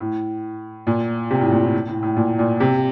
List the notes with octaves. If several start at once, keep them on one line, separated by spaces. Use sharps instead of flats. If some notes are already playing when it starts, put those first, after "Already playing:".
A2
A#2
C3
A2
A#2
A2
A2
A2
A#2
A#2
C3